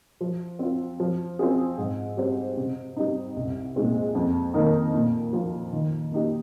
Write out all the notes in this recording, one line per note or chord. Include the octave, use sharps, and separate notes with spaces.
F3
C4 F4
F3
C4 F4 G#4
G#2
G3 C4 G4 C5
C3
G3 C4 D#4
C2
A#2 G#3 C4 D#4
F2
D#3 A#3 D#4 A#4
A#2
F3 A#3 F4
D#3
A#3 D#4 G4